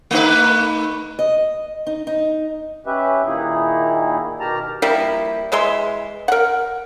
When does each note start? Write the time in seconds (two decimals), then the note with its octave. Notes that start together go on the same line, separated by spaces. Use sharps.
0.11 A3 D#4 B4
1.19 D#5
1.87 D#4
2.07 D#4
2.86 C#4 G4 B4 E5
3.26 A#2 D#3 A#3 D#4 E4 G#4
4.40 B2 D#3 G4 A5 A#5 F6
4.82 F3 G3 A#3 E4
5.52 E3 G#3 E5 C6
6.28 A#4 F#5